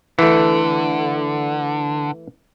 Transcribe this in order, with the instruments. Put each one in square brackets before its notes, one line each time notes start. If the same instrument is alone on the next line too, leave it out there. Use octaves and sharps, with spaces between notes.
[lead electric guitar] D3 [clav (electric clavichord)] E3 A3